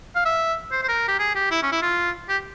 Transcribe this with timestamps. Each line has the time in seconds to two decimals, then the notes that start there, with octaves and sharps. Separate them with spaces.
0.15 F5
0.25 E5
0.72 C5
0.83 C5
0.88 A#4
1.08 G4
1.19 G#4
1.35 G4
1.51 E4
1.63 C#4
1.72 E4
1.82 F4
2.29 G4